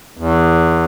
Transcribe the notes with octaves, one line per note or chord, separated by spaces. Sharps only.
E2